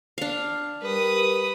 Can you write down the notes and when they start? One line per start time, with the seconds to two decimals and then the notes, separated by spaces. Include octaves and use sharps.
0.18 D4 F5
0.82 G3 A#4 B4 D#6